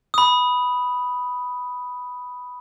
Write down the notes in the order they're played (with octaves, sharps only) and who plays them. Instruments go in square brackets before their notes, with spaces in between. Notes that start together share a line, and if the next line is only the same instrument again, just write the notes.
[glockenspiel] B5 D#6